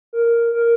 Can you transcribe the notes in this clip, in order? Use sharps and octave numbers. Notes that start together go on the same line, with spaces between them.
A#4
A#4